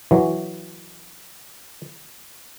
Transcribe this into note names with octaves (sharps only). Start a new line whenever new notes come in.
E3 F#3